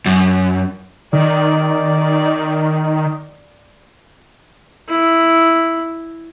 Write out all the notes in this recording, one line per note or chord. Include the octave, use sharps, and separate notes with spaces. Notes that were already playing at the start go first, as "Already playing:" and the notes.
F#2
D#3 D5
E4